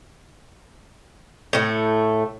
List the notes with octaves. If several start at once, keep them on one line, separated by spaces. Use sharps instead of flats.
A2 A3